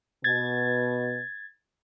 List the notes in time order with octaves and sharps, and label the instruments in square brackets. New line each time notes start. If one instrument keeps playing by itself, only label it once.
[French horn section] B2 [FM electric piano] G#6 A6